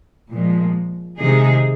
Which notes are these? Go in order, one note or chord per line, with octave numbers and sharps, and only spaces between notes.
A#2 F3 G#3
C3 D#3 G#3 D#4 G#4